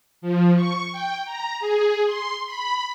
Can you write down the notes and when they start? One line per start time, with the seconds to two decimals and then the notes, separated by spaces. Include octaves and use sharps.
0.22 F3
0.56 C#6
0.92 G5
1.25 A#5
1.60 G#4
2.06 C6
2.46 B5